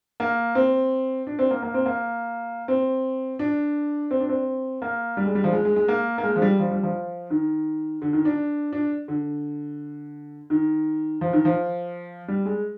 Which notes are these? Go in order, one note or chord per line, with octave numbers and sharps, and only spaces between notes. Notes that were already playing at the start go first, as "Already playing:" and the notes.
A#3
C4
D4
C4
A#3
A#3
C4
A#3
C4
D4
C4
D4
C4
A#3
G3
G#3
G3
F3
G#3
G#3
G#3
A#3
A#3
G#3
F3
G3
F3
G3
F3
D#3
D3
D#3
D4
D4
D3
D#3
F3
D#3
F3
G3
G#3